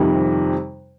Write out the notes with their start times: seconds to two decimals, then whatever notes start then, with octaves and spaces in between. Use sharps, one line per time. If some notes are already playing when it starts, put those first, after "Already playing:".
Already playing: F2 C3 D#3 G3